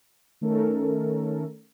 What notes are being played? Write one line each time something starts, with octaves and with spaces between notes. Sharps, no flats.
D#3 A3 C#4 A4 A#4